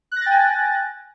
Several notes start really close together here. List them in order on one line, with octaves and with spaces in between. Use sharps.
F#6 A#6 A6 G5 G#5